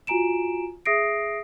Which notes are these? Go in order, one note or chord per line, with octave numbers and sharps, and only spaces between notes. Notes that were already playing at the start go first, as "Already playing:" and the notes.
F4 F#4 G#5 A#5 D7 E7
G#4 E5 D#6 A#6 C7 D7